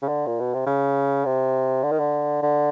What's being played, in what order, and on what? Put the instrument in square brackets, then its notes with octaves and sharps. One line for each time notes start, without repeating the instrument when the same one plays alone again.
[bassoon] C#3
D3
A#2
B2
C3
C#3
C3
D3
D#3
D3
D3